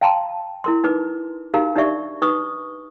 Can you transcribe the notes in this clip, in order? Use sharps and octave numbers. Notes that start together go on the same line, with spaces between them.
F5 G5 A5 A#5 C6
E4 A#4 C6
D#4 B4 D6
D#4 F#4 G4 A#4 F5 A#5
D4 D#4 G4 D5 E5 C#6
D#4 B4 C#6 D#6